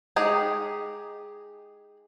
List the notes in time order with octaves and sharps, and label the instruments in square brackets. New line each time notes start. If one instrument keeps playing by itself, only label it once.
[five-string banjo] G#3 D#4 G4 G#4